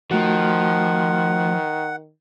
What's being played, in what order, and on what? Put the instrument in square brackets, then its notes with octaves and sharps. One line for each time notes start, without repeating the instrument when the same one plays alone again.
[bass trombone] D#3 [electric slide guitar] F3 [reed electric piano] A3 F#4 [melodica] F#5